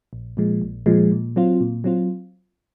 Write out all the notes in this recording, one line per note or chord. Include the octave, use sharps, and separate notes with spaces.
A#1
A#2 F3 G#3
A#1
A#2 F3 G#3
A#2
F#3 C4 F4
A#2
F#3 C4 F4